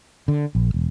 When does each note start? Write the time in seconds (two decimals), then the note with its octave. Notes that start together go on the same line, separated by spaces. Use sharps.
0.28 D3
0.55 A#1
0.74 E1